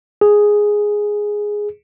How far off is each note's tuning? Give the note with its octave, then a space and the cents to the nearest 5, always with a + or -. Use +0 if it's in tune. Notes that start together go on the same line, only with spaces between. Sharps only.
G#4 +0